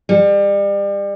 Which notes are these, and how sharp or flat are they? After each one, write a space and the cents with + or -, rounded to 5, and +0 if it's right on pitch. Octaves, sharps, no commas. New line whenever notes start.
G3 +35